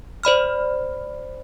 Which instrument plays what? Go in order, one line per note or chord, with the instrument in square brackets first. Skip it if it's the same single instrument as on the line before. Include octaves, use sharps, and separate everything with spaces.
[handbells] C5 D5 B5 F6